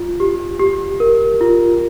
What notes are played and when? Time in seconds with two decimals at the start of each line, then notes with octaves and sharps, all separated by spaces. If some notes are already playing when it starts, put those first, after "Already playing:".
Already playing: F4
0.20 G4
0.60 G4
1.00 A#4
1.41 F4